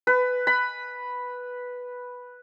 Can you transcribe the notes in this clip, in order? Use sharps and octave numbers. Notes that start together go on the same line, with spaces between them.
B4
B5